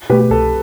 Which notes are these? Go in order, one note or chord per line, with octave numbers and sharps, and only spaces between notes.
B2 A3 G4 B4
G4
C2 A4